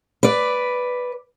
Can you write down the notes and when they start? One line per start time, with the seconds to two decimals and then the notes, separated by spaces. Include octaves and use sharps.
0.23 B4 D5